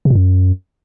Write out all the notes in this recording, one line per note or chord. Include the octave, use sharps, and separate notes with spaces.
C3
A#2
F#2